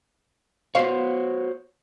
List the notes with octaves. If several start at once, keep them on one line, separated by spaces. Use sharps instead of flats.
B3 F#4 C5 C#5 F5